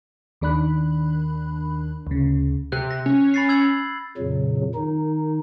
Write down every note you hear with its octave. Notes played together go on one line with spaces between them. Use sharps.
D#2 D#3 D4 B5 F#6
D2 C#3
C3 F#6
A#6
C#4
B5 A6 C7
E6 G#6 F#7
F2 A#2 C#3 F#3
D#3 D#4